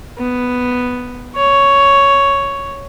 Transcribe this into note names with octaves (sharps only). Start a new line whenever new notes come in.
B3
C#5